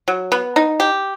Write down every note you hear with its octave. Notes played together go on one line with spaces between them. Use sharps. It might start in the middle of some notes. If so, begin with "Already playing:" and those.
F#3
B3
D#4
G4